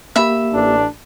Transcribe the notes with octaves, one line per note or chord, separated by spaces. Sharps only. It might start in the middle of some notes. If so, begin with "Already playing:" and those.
A#3 G4 E5 B5
A1 D4